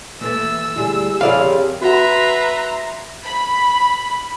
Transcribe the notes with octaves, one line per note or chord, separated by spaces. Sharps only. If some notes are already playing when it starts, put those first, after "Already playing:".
E3 A3 A#3 E6 A6
D2 G3 E4 G#4
F2 C3 G#4 A#4 C#5 D5 F5 B5
F#4 B4 E5 F#5 A#5 C6
B5